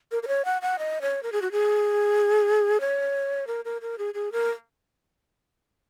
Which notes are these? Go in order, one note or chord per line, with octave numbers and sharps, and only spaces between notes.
A#4
A#4
C#5
F#5
F#5
D#5
C#5
A#4
G#4
F#4
G#4
C#5
A#4
A#4
A#4
G#4
G#4
A#4